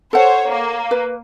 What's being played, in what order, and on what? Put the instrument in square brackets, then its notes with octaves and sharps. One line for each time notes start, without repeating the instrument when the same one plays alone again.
[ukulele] A4 F#5 [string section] C5 C#5
[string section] A#3
[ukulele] B4